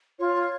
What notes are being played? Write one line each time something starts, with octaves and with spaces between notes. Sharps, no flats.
F4 C#5